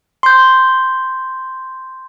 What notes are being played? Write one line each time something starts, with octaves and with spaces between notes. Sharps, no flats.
C6 G6